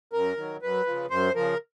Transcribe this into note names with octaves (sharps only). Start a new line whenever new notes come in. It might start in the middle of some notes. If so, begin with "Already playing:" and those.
F#2 A#4
D#3 F#3
F#2 B4
C#3 F3
F#2 C5
C#3 F3 A#4